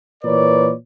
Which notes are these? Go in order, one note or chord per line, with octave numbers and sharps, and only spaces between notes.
A#2 E3 A#4 B4 C#5 D5